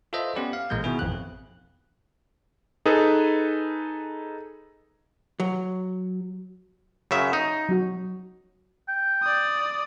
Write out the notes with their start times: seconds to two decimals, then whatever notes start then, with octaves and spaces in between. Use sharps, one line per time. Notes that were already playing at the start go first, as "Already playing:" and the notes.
0.13 F4 A4 B4 C5 D#5 E5
0.35 B3 C#4 G4 B4 D5
0.53 F5
0.70 A1 A#2 G#3 A#3 G6
0.84 B2 D#3 B3 E4 G#4
0.99 A1 F2 F#6
2.86 D#4 G#4 A4 B4
5.40 F#3
7.11 F#2 C#3 E5
7.33 D#4
7.69 F#3 F#4
8.88 G5
9.22 D5 D#6